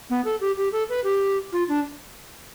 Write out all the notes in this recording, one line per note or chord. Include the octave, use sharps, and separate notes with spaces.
B3
A4
G4
G4
A4
B4
G4
F4
D4